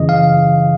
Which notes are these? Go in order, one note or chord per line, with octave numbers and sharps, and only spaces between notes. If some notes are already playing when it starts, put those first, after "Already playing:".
Already playing: F#2 C#3 E3 D#5
F5